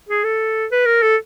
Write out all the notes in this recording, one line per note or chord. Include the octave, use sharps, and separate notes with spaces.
G#4
A4
B4
A#4
A4